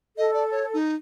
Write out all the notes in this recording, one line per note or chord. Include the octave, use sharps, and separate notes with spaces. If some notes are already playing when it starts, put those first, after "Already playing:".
A4 D#5
D5
C#5
D#4